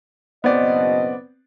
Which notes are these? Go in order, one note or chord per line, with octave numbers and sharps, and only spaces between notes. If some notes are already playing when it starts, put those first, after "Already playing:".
F#1 B2 B3 C4 D5 D#5